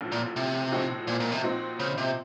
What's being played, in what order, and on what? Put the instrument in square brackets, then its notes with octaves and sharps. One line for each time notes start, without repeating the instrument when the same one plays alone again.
[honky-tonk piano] A1 A2 F3
[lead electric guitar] A#2
C3
[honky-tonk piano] A2 F3 C4 D#4 F#4
[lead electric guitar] A#2
A#2
C3
[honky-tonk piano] A#2 F3 C4 D#4 F#4
[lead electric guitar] C#3
C3